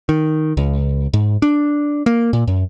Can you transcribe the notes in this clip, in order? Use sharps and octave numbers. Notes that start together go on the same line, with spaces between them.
D#3
C#2
G#2
D4
A#3
A#2
F#2